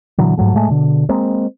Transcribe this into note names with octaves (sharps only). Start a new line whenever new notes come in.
A#2 D3 E3 F#3
G#2 F3 F#3 A3
A2 F#3 G#3 A3
B2 D3
G#3 A#3 C4